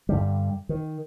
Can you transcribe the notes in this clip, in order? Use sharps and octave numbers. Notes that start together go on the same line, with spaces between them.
G2 D3 G3
D#3